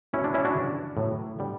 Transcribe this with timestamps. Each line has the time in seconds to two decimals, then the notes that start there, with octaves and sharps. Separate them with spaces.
0.13 B2 F#3 A3 C#4 E4
0.24 D4
0.34 C#4 E4
0.45 D4 F#4
0.55 F#2 C#3 E3 G3
0.97 A2 F#3 B3
1.39 D3 G3 B3